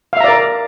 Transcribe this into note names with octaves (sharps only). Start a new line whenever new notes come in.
A#4 D5 E5 F5 A#5